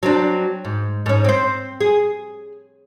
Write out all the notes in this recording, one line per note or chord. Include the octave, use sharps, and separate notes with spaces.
F#3 C4 D4
G#2
G#2 C#4
C4 C5
G#4